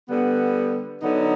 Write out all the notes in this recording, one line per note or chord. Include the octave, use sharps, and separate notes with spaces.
D3 G3 B3
D3 F#3 B3 D#4